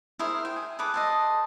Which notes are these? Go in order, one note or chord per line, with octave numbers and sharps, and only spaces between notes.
E4 G#4 A#4 C5
G5
G#5
G#4 A4 B4 D6
A4 C5 D#5